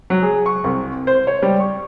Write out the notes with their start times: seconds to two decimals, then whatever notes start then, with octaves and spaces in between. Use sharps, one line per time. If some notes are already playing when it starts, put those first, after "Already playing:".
0.10 F#3
0.22 G#4
0.46 C#6
0.64 C2
1.07 C5
1.27 C#5
1.42 G3
1.60 C#6